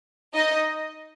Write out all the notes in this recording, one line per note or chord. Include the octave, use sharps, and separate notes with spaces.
D#4 D#5